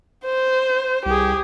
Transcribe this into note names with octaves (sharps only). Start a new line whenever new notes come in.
C5
C2 G4 G#4